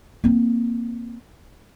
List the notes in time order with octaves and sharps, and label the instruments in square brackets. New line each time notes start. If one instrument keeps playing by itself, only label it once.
[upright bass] A#3 C4